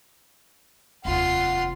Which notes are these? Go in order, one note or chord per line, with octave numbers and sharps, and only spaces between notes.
F1 D#2 F4 F#5 C6